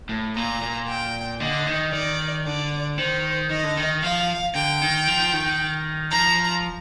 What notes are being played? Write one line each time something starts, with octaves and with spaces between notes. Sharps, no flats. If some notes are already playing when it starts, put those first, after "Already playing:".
A2
A#2 A#5
A#2
G5
D3 D#5
D#3
D#3 D5
D3 D5
D#3 C5
D#3 D#5
D3
D#3
F3 F5
D3 G5
D#3
F3
D#3
F3 A#5